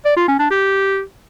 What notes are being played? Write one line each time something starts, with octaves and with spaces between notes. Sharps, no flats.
D5
F4
C#4
D4
G4